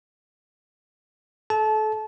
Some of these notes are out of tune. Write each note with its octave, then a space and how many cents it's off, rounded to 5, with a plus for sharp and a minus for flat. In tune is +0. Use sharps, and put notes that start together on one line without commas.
A4 -30 A5 -25